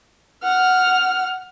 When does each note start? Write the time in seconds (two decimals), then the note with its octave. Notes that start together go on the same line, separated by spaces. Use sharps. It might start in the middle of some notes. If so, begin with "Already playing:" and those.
0.43 F#5 F6